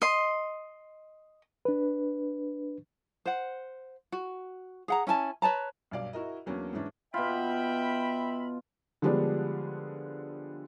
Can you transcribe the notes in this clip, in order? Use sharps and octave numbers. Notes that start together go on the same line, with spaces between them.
D#5 C6
D4 B4
C5 F#5
F#4
G#4 F#5 A#5
C#4 E4 G#5 A5
B4 C#5 A5 A#5
B1 G2 D5 F5
E4 F#4 A#4 D#5
E2 F#3 A#3 C#4 D4
G#2 E3 C#4 D4
B2 F4 E5 G5 B5
D3 F3 G3 G#3 B3 D4